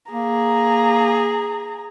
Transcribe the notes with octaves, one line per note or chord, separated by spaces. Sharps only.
A#3 G#4 A#5